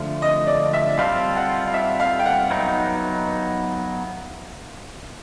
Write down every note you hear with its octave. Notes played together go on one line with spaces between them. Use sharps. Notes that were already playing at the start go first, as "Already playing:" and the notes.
Already playing: D3 F3 A3
D#5
D5
E5
G3 C4 F4 A4 F5
F#5
F5
E5
F5
G5
F#5
F#3 B3 D#4